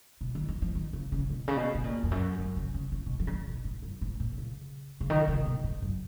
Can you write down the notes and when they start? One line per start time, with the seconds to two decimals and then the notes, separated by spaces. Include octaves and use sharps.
0.21 B2
0.35 D#3
0.49 D#3
0.62 F3
0.75 D#3
0.93 C#3
1.12 C#3
1.30 B2
1.48 C#3
1.57 B2
1.75 B2
1.84 A#2
2.03 F2
2.11 F#2
2.38 F#2
2.56 C#3
2.74 C#3
2.92 C#3
3.06 B2
3.20 F3
3.27 C#3
3.33 D#3
3.47 B2
3.64 G#2
3.83 F#2
4.01 G#2
4.20 A#2
4.38 C#3
5.00 C#3
5.10 D#3
5.28 C#3
5.46 B2
5.64 G#2
5.82 F#2